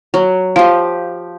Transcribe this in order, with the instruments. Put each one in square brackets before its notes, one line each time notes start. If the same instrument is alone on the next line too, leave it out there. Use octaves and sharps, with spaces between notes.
[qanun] F#3
[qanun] F3 G4 [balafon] F5